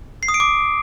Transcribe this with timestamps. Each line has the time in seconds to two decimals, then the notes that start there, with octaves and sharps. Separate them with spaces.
0.23 C7
0.28 D#6
0.34 D7
0.40 D6